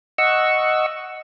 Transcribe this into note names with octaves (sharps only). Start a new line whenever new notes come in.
D#5 F#5 C#6 E6